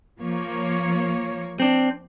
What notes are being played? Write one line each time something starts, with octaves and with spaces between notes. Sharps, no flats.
F3 A#3 C#5
C4 D4